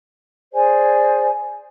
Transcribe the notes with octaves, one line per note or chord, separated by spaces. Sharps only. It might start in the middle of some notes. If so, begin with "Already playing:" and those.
G#4 C5 D5 G#5